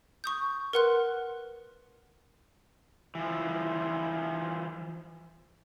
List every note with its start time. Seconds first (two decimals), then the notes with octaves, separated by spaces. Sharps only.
0.24 C#6 D#6 G6
0.73 A#4 B4 F#5 C6 F#6
3.15 E3 F3